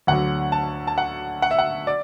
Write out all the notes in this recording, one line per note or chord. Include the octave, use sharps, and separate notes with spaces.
D2 D3 F#3 F#5
A5
A5
F#5
F#5
E5
F#5
D5